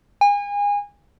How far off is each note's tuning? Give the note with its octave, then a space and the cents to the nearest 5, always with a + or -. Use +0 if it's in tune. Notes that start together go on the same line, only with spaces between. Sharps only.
G#5 -30